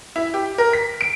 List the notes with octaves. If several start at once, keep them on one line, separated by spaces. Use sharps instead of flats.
E4
G4
A#4
B6
D7